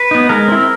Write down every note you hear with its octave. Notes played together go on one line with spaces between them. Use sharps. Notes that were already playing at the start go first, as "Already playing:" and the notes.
Already playing: B4
B3 D#4
G#3 A#4
C4 E4